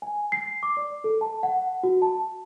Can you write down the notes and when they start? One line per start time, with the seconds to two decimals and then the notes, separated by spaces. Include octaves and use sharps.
0.02 G#5
0.32 C7
0.63 D6
0.77 D5
1.04 A4
1.21 A5
1.43 F#5
1.83 F#4
2.02 A5